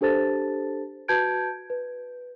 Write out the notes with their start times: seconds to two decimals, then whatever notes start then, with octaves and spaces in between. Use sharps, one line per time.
0.01 D4 G4 A4 C5 A5 A6
1.08 F#4 B4 A5 G6 G#6 D7
1.70 B4